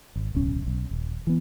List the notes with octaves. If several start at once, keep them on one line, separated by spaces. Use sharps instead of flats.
G#1
D1 B1 C#4
B1
D#1
E3 B3